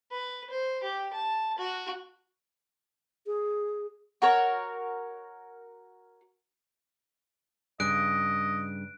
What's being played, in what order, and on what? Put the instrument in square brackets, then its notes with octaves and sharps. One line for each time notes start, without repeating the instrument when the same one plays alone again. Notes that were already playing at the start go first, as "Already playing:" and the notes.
[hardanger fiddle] B4
C5
G4
A5
F#4
[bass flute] G#4
[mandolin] F#4 A#4 C#5
[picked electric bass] G2 C#3 [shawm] D#5 [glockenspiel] F#6 D7